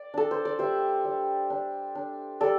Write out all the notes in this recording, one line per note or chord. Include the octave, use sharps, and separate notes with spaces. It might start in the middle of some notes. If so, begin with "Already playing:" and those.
Already playing: D5
D4 A4
C5
D5
G3 C5 E5
G3
D4
D4
G3 A4 D5